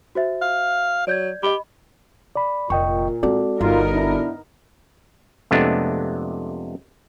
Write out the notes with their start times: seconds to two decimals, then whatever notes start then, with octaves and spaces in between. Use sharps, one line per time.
0.15 F#4 C5 E5
0.42 F5
1.07 F#3 D5 G6 G#6
1.43 G4 D#5 B5
2.36 D5 B5
2.70 F1 A#2 D#5 G5 C#6
3.23 G#3 C4 F#4 A4 D5
3.61 G1 G3 B3 D#4 F4 A#4
3.93 D4 E4
5.51 F2 C3 G#3 A3 B3 D4